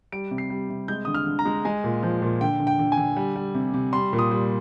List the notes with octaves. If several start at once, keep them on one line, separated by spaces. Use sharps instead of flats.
G3 D7
C3
C7
G3
C3
G#3 G6
D3 D#6
F6
D3
A#5
G#3
G#3 G#5
A#2
F3
A#2
D3 G5
D3
G5
D3
G#5
D3
G3
G3
C3
C3
G3 C6
A#2
D#6
G3